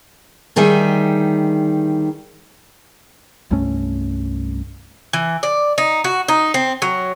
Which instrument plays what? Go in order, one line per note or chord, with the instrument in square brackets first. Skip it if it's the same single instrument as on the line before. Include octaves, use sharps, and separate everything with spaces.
[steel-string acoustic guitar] D2 D#3 G3 G#4 E5
[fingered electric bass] C2 G2 A3 C#4
[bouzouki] E3
D5
D#4
F#4
D#4
C4
F#3